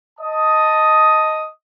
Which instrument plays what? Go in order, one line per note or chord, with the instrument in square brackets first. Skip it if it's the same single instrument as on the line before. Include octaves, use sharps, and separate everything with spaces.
[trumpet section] D#5 A5 D#6